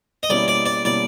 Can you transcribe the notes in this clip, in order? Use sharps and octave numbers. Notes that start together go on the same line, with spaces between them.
D#5
B2 G3 A#3 C#4 E4 D5
D5
D5
B2 G3 A#3 C#4 E4 D5